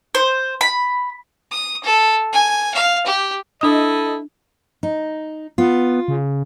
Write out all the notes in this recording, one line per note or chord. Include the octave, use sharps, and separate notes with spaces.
C5
B5
D#6
A4
G#5
F5
G4
D4 E4 A4 D#5 D#6
D#4
B3 F4
C#3